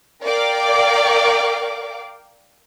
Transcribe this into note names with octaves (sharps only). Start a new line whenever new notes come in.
A#4 D5 F5 G5 D6